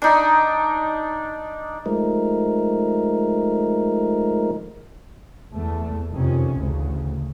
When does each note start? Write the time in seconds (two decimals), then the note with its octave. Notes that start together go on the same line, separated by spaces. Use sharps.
0.02 D4 D#4
1.86 F3 G#3 A3 D#4 A#4
5.53 E2 A3
6.12 F2 C3 D#3 C#4
6.54 A1 D2 C#3